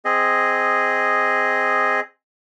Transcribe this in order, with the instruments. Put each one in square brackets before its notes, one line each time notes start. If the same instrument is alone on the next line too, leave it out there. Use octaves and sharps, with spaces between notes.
[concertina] C4 G#4 D#5